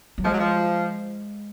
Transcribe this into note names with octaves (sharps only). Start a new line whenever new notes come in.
F#3
F3 G#3
F#3
F3